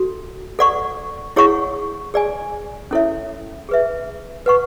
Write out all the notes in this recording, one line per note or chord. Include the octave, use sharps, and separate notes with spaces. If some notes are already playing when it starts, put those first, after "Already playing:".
Already playing: F#4 A4
A4 D5 F#5 C#6
E4 G#4 C#5 F#5 C#6
G#4 D5 G#5
C#4 E4 A4 C#5 E5
G#4 B4 E5
B4 F#5 C#6